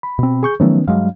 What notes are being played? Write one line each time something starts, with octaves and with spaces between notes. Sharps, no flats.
B5
B2 C4
G#4 C#6 G6
D#3 F3 F#3 A3 B3 C#4
G2 F#3 G#3 F5